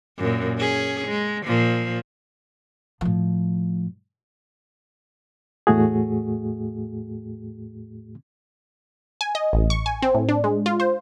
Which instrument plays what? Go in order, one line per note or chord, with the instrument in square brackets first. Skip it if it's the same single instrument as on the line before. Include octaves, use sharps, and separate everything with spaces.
[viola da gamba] F#2 A#2
C#4 G#4
G#3
A#2 F3
[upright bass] A2 F3
[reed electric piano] E2 A2 A3 F#4 G#4
[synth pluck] G#5
D#5
A1
C#6
G#5
C4
A2
D4
G#3
F4
C5